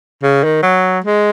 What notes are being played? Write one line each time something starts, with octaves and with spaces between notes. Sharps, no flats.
C#3
D#3
F#3
G#3